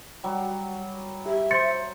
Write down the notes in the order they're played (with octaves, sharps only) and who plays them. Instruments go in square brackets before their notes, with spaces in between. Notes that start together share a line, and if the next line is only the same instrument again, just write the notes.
[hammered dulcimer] F#3 G3
[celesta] G4 [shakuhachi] E5
[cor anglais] C5 [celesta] C6 A6 C#7